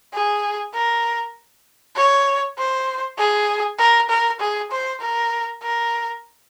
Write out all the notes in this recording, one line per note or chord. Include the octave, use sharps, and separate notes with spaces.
G#4
A#4
C#5
C5
G#4
A#4
A#4
G#4
C5
A#4
A#4